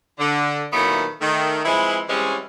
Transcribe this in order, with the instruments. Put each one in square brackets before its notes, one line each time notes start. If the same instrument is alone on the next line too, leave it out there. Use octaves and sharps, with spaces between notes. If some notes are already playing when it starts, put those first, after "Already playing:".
[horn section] D3
A#2 D#3 E3 F#3 A3 B3
D#3 A3
E3 F3 G#3 C4 E4
E3 G3 G#3 C4 C#4